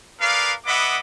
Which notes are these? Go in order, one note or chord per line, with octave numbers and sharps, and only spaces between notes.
G#4 A#4 B4 D5 F5
B3 D#5 E5 F#5 B5 D6